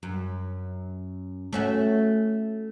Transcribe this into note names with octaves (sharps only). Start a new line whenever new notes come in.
F#2
A3 C#4 F#4